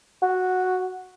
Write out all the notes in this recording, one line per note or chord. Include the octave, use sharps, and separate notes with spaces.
F#4